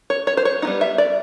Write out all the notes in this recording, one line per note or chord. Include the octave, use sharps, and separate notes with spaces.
C#5
C#5
C5
C#5
D#4
G3 B3
E5
D5